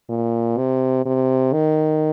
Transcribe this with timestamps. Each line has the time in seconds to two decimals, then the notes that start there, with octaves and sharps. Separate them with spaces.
0.09 A#2
0.57 C3
1.05 C3
1.53 D#3